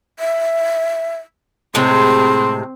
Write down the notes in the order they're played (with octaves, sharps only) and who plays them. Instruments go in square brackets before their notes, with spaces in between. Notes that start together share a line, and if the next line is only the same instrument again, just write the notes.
[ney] E5
[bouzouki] A2 C3 G#3 [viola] C4 [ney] C6